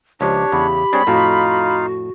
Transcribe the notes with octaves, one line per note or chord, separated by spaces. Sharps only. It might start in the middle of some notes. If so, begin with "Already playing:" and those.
C#2 F3 D4 G4 C#5
E2 C#3 B5
G3 C4 D4 G#4 C#5
F2 A2 D#4 F4 F#4 F5